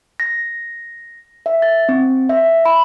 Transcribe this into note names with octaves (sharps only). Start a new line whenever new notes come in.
A#6
E5
A6
C4
E5
B5